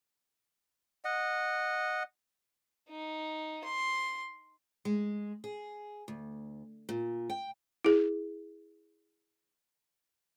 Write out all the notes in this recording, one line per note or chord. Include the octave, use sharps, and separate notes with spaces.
D#5 F#5
D#4
C6
G#3
G#4
D2
A#2
G5
E4 G#4